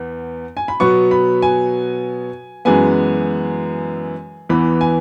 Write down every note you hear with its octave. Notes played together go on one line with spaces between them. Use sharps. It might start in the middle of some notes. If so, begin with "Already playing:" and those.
Already playing: E2 B3
G#5
B5
B2 F#3 B3 C#6
B5
G#5
F#2 E3 G#3 B3 G#5
E2 E3 B3 B5
G#5